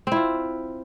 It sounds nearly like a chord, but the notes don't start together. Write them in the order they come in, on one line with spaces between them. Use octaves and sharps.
C4 E4 F4